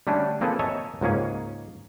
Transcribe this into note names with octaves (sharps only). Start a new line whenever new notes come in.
D3 G3 A3 C#4 D4
A#3 C4 F4 G#4 A4 B4
A4 C#5 D#5 E5 G#5 A#5
C#2 G#2 A#3 C#4 G#4